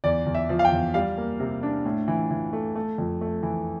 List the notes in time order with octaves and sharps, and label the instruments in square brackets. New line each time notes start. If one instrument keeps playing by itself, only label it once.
[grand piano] E2 D5
E2
E5
F3
F5
G5
E2
G3 F5
A#3
C3
D4
A2
E3
E3
A3
A3
F2
A3
E3